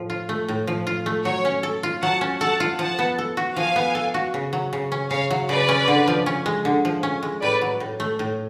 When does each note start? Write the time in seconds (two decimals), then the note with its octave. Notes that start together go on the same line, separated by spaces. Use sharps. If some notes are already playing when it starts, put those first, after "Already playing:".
Already playing: A2 F3
0.10 F4
0.29 A3
0.48 A2
0.67 F3
0.87 F4
1.06 A3
1.25 F#3 C#5
1.45 C#4
1.63 A4
1.83 F4
2.02 F#3 F#5 A5
2.21 C#4
2.40 A4 F#5 A5
2.60 F4
2.79 F3 F#5 A5
2.99 B3
3.18 A4
3.37 F#4
3.56 F3 F5 G#5
3.76 B3
3.95 A4
4.14 F#4
4.34 C#3
4.53 F#3
4.73 C#3
4.92 C#4
5.11 C#3 C#5 F5
5.30 F#3
5.49 C#3 B4 D5
5.69 C#4
5.88 D3
6.08 F3
6.26 C#4
6.46 G#3
6.65 D3
6.85 F3
7.03 C#4
7.23 G#3
7.41 A2 B4 D5
7.61 F#3
7.80 A2
8.00 A3
8.19 A2